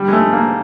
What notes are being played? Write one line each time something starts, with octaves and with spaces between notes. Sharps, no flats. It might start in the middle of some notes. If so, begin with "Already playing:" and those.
Already playing: G3
G#3
A3
A#3